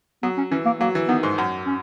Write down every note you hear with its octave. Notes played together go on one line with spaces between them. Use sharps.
F#3 B3
C#4
E3 C#4
A#3
F#3 A#3
E3
D#3 B3
G#2
F#2
C#4